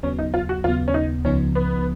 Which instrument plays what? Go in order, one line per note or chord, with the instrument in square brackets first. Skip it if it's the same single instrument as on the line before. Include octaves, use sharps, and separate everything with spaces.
[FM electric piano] D#2 C#3 F#3 B3 [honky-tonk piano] C#4
[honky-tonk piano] D#4
F4
F#4
[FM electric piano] D#2 C#3 F#3 B3 [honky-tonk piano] F4
[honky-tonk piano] C#4
D#4
[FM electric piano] C#2 C#3 F3 B3 D#4 [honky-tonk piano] C#4
[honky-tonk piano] B3